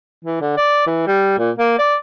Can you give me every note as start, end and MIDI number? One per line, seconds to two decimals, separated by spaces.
0.24 0.40 52
0.41 0.53 50
0.57 0.82 74
0.86 1.06 52
1.07 1.37 55
1.38 1.51 46
1.58 1.76 58
1.79 1.96 74